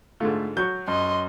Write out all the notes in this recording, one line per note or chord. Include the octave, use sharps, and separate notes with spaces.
G#2 D3 A3 F4
F#3 F#4 C#6 G6
F#2 D#5 C6